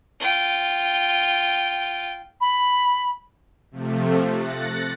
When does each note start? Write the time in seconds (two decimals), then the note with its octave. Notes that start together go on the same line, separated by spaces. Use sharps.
0.20 F4 G5
2.41 B5
3.71 C3 F3 A3
4.33 F#6 A6 A#6 C#7